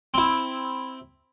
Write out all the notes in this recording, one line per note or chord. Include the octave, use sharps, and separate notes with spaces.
C4 E4